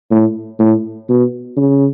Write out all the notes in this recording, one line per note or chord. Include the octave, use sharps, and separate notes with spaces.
A2
A2
B2
C#3